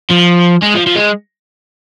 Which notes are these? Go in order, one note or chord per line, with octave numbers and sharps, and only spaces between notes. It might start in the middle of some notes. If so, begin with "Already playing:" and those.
F3
G#3
F3
F3
G#3